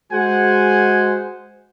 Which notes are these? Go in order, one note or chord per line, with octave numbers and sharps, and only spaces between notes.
G#3 F#4 G#4 C5 F#5 G#5